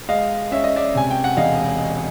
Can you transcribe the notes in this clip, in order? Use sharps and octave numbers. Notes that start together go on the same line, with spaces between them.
G#3 D#5 F5
C#4 E5
D#5
D5 E5
C3 G#5
G5
F#5
E1 D#5 F5